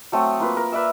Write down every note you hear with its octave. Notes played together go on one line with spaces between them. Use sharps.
F#3 A3 C4 D#6
A#3 F4 B4
A#4
B4 D5 E5 E6